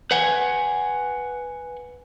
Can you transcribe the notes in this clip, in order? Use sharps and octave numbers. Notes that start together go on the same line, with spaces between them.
B4 F#5 G#5